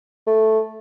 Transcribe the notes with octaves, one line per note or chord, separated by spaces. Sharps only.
A3